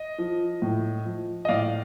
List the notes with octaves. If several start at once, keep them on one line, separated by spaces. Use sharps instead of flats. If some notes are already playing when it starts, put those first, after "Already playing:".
Already playing: D#5
F3
A2
F3
D#5
A2 D5 F5